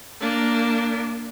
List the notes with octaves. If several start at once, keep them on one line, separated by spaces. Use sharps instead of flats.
A#3 D4